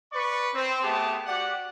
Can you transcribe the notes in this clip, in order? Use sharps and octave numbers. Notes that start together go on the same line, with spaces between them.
B4 D5 C#6
C4
A3 B3 G4 G#4 A5
F#4 G4 D5 F#5